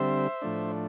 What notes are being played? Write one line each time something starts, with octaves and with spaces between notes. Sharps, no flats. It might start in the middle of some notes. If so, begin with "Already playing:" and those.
Already playing: D3 G3 C4 C5 E5
A2 F3 A3 D4